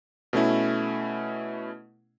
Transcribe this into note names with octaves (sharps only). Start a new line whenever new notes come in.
B2 A3 C#4 E4